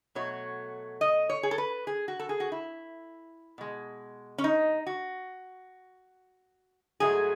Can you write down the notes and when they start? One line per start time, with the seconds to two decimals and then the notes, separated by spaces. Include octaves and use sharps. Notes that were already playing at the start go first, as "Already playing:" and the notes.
0.15 B2 F#3 A3 C#5
1.01 D#5
1.30 C#5
1.43 G#4
1.51 A4
1.58 B4
1.87 G#4
2.08 F#4
2.19 A4
2.29 G#4
2.40 F#4
2.52 E4
3.58 B2 G#3
4.38 C#4
4.44 D#4
4.87 F#4
7.00 G#2 F#3 A3 G#4